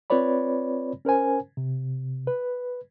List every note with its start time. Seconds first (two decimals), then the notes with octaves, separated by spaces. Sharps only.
0.10 C4 F4 B4 C#5 D5 B5
1.05 C#4 A#4 C5 G#5
1.57 C3
2.27 B4